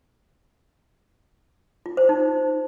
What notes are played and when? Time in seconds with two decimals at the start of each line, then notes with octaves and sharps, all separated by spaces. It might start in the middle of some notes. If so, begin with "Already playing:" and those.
1.86 F4
1.97 C5
2.09 D#4